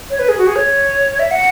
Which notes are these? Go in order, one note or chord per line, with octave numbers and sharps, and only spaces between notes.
C#5
B4
G#4
F#4
G#4
C#5
E5
F#5